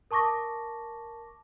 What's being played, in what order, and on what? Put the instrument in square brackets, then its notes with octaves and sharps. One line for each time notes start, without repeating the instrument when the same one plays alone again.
[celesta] A#4 A5 C#6 D6 A#6